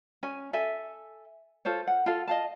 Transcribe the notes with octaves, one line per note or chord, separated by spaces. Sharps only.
C#4 G#5
A4 E5 G#5
F4 A4 C5 C#5
F#5
F4 A4 F5
D#5 F5 A5